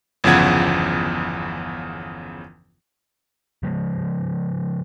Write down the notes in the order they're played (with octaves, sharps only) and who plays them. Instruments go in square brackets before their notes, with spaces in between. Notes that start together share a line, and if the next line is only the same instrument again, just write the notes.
[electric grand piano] G1 E2 C#3 F3 F#5 G#6
[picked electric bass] C#3 F3 G#3